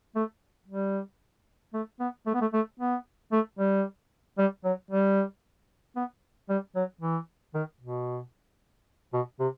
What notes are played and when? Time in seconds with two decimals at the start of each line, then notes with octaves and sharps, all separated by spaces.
0.15 A3
0.68 G3
1.73 A3
2.00 B3
2.27 A3
2.34 B3
2.41 A3
2.53 A3
2.80 B3
3.32 A3
3.59 G3
4.38 G3
4.64 F#3
4.91 G3
5.96 B3
6.49 G3
6.75 F#3
7.01 E3
7.54 D#3
7.81 B2
9.13 B2
9.40 C3